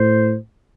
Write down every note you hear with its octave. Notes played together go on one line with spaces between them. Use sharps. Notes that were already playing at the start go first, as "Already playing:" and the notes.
Already playing: A2 C5